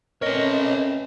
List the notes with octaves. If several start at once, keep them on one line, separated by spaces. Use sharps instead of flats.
A3 C4 C#4 A#4 B4 C#5 D#5